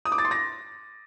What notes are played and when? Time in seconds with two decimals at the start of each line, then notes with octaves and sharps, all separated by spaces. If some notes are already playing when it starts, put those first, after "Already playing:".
0.05 D#6
0.12 D6
0.18 A6
0.25 C6
0.31 A#6